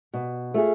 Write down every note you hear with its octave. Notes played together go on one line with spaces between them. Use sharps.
B2
A3 F4 G#4